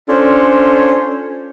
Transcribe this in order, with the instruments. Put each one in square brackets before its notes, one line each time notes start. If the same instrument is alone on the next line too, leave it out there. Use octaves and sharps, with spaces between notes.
[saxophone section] C#4 D4 F4 A4 C5